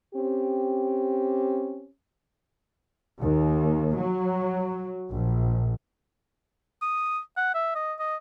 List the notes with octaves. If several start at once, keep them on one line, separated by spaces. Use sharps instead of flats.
C4 C#4 G4
D#2
F#3
A#1
D#6
F#5
E5
D#5
D#5